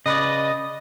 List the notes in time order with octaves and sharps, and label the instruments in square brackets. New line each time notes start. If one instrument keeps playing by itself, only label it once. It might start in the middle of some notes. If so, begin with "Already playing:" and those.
[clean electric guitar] C#3 B4 D5 [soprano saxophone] D#5